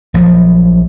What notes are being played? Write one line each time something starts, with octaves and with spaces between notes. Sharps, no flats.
A#1 F3 F#3